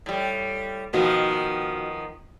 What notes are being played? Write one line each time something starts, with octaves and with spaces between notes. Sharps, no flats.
A2 G3
B2 D#3 F3 B3